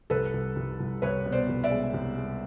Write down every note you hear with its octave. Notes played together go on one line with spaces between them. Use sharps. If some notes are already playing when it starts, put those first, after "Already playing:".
C2 A4 B4
C2
C2
C2
C2 B4 C#5
B2
C5 D5
C2
D5 E5
G#3
C2
G#3